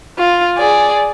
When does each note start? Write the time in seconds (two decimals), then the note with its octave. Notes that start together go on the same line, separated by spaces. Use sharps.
0.19 F4
0.57 G#4 D5